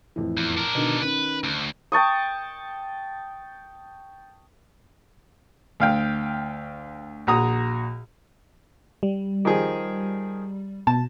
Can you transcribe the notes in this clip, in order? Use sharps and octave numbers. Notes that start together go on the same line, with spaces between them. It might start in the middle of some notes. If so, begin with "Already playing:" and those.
F2 A2 E3
E2
D4 A#4
B2 D3 D#3
D#3 C#4 B4
D2
G5 A5 C#6 D#6
D2 F5 G5
A#1 F#4 A#5 D#6
G3
D#3 F3 G#4
B2 A5